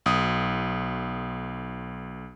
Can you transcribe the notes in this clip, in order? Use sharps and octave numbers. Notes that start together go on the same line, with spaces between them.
B1 D#6